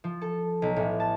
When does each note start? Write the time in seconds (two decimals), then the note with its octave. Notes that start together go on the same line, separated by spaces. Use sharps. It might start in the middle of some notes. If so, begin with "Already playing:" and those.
0.04 F3
0.21 A4
0.62 B1
0.76 A1
1.00 A5